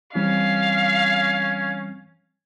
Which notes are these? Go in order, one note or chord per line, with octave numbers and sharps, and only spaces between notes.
E3 G3 C4 C#4 F5